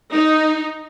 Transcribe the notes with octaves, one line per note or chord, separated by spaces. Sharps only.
D#4